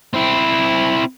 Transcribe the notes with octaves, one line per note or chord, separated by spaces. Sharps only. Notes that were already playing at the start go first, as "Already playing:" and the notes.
C4 E4